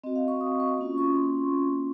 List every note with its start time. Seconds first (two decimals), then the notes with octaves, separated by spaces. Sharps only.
0.04 C4 F#4 D#5
0.16 F5
0.28 C#6
0.41 D#6
0.60 C#6
0.78 A#3 C#4 F4 C#6
0.98 C#6
1.16 C6